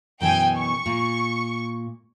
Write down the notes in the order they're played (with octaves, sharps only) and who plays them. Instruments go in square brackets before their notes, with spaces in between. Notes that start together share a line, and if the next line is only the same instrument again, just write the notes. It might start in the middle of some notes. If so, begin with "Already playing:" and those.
[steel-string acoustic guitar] F#2 B2 E3 [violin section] G5 G#5
[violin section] C#6
[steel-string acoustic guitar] A#2